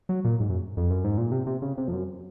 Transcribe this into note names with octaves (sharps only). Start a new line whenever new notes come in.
F#3
A#2
G#2
F#2
F2
F#2
G#2
A#2
C3
C3
C#3
C3
F2
F#2